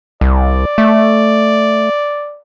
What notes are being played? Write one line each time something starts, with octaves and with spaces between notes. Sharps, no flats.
C2 D5
A3